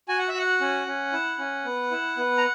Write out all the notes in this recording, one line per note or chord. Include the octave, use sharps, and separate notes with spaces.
F#4 G#5
F#5
E5
F#4 F#5
C#4
C#4
E4
C#4
B3
E4
B3
A#5